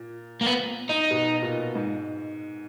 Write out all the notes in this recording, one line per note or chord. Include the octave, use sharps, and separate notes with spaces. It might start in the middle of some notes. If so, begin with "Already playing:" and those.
Already playing: A#2
A#3
B3
D#4
B2
A#2
G#2